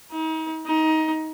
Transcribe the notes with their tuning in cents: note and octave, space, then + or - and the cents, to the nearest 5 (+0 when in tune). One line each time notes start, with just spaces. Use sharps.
D#4 +40
D#4 +20